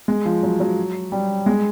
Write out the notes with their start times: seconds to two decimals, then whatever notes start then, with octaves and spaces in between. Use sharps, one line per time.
0.08 G#3
0.25 F3
0.43 F#3
0.60 F#3
1.12 G3
1.46 G#3